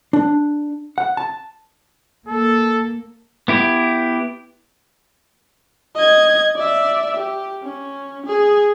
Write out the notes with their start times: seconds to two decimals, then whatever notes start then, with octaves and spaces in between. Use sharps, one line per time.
0.13 D4
0.98 F#5
1.17 A5
2.28 A#3 A4
3.48 B3 E4 G4
5.95 D#5 G#6
6.56 D5 E5
7.17 G4
7.63 C#4
8.26 G#4